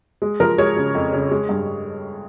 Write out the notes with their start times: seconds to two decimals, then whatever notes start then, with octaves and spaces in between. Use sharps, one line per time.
0.22 G#3
0.40 F3 A#4
0.58 G#3 C#5
0.76 C#3
0.95 F2
1.13 C#3
1.31 G#3
1.49 G2